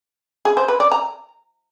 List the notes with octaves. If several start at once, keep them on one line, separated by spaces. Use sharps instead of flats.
G#4
C5
B4
D5
A#5